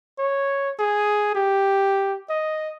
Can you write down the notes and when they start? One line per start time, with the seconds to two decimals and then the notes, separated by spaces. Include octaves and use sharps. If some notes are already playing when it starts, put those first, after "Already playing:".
0.18 C#5
0.79 G#4
1.35 G4
2.30 D#5